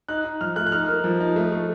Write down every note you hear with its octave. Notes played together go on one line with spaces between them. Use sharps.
D#4 F#6
D#4
F3 F6
A3 F#6
F#6
D#4 F6
A#3
F3
D#4
A3
A3